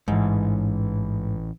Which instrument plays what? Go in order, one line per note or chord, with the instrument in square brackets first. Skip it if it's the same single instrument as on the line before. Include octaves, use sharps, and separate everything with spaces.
[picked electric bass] A1 E3 [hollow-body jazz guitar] G#2